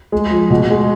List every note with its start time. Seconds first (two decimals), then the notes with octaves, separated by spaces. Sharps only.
0.12 G#3
0.31 F3
0.50 B2
0.70 G#3